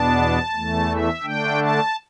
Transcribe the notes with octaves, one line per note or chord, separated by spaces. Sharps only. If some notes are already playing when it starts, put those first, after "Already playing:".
Already playing: E2 B2 B3 D4 A5
E2 E3 A3
E5
D3 A3 D4 G5
A5